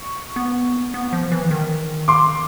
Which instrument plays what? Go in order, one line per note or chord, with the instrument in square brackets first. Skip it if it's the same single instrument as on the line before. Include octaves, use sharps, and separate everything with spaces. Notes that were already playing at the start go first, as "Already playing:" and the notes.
Already playing: [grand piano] C#6
[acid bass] B3
B3
F3
E3
D#3
[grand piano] C6 D6